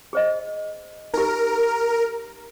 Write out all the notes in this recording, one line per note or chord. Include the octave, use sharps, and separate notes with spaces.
G#4 C5 D#5
D#4 G4 A#4